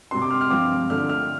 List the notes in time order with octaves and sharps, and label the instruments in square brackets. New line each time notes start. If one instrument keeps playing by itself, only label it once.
[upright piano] C3 G3 C4 C6
D6
F6
F6
G2 F3 C4 D6
D3 A3 D4 F6
F6